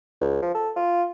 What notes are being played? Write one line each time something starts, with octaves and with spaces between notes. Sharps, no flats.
C#2
F3
A4
F4